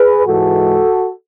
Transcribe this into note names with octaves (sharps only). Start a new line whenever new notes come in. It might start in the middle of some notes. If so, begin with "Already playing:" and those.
Already playing: G#4 B4
G#2 E3 G#3 F#4 A4